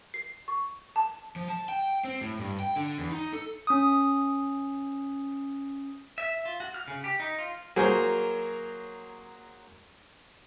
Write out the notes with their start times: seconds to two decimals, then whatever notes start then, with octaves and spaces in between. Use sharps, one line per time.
0.14 C7
0.48 C#6
0.96 A5
1.36 F3
1.48 A5
1.69 G5
2.04 C4
2.21 A2
2.39 G2
2.60 G5
2.76 D3
2.98 E2
3.11 D#4
3.33 A4
3.67 C#4 D#6
6.18 E5
6.46 F4
6.60 F#4
6.74 F6
6.88 C#3
7.04 G4
7.20 D#4
7.38 F4
7.76 F#3 A#3 G#4 A#4 C5 C#5